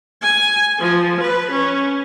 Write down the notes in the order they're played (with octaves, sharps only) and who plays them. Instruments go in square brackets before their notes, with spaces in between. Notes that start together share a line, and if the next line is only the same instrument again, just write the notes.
[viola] G#5
F3
B4
C#4